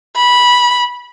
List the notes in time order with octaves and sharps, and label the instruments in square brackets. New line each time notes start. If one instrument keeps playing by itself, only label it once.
[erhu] B5